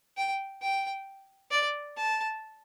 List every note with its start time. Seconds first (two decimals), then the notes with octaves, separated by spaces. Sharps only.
0.17 G5
0.61 G5
1.51 D5
1.96 A5